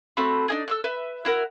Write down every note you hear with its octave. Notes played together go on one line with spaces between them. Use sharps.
A3 C4 F#4 B5
D4 D#4 G#4
A4 E6 F#6
B4 E5
E4 F#4 A#4